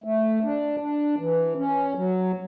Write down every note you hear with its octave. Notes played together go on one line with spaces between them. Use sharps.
A3
D4
D4
E3
C#4
F#3